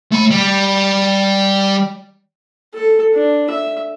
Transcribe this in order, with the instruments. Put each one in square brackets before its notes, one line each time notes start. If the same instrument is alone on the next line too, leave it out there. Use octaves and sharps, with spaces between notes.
[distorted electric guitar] A3 B5
G3
[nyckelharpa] A4
D4
E5